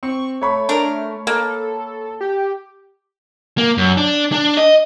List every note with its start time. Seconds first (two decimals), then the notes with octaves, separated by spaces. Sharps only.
0.03 C4 C#6
0.42 A3 C#5 B5 C#6
0.69 D4 A#4
1.27 A#3 A4
2.21 G4
3.58 A#3
3.77 F#2
3.97 D4
4.32 D4
4.57 D#5